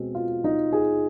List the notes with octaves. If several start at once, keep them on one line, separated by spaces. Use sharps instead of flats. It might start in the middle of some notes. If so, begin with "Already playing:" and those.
Already playing: B2 G#3 C4 F#4
F4
D#4
G#4